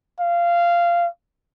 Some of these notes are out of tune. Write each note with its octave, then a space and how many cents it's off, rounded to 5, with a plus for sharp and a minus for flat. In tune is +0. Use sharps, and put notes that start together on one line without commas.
F5 -15